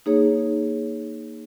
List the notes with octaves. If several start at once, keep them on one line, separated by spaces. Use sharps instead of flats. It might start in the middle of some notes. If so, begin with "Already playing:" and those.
A#3 D#4 G#4 C#5